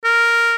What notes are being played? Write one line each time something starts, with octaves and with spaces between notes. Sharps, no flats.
A#4